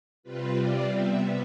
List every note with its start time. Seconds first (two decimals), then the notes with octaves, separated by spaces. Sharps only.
0.23 C3 G3 C4 F4 B4
0.56 D5
0.89 C3 G3 B3 E5